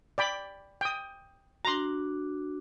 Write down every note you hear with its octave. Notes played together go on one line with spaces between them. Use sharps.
D5 G5 B5
G5 D#6
D4 F#4 A#5 C6